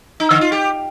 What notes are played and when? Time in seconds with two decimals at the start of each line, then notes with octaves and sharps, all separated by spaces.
0.20 D#4
0.31 D3
0.41 F4
0.52 G4